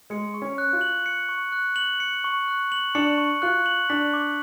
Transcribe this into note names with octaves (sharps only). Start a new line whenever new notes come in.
G#3 C#7
C#6
C#4
F#6
F4
F#7
C#7
C#6
F#6
F#7
C#7
C#6
F#6
F#7
D4 C#7
C#6
F4 F#6
F#7
D4 B6
D6